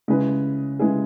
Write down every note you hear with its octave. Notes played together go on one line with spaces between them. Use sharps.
C#3 G#3 E4 G#4 B4
C#3 G#3 E4 G#4 B4